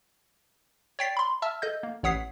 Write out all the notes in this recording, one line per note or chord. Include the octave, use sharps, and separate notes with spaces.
C#5 D5 G5 A6 B6 C7
B5 C6
E5 A5 E6 F6
A4 D#5 G6
A#3
A1 C#5 F#5 D#6 B6 C7